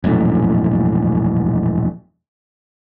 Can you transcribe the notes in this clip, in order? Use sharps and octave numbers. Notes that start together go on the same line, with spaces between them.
E1 A#1 F#2 A2